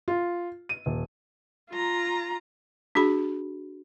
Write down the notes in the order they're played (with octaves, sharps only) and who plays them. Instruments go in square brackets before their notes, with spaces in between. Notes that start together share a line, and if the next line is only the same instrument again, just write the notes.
[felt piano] F4
D#7
D#1
[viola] F4 A#5
[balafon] D4 F#4 G#4 B5